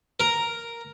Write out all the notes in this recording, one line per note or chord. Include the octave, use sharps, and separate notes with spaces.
A#4